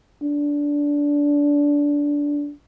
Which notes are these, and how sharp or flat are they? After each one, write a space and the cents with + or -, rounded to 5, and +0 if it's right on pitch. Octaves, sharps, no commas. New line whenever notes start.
D4 -15